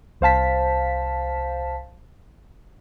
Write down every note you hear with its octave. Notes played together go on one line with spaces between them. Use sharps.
C2 C5 F5 A5 B6